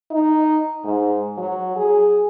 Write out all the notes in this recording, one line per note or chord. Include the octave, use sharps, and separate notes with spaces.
D#4
G#2
F#3
G#4